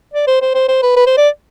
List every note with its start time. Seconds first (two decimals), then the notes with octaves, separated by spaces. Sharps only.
0.13 D5
0.27 C5
0.42 C5
0.54 C5
0.68 C5
0.83 B4
0.96 B4
1.07 C5
1.17 D5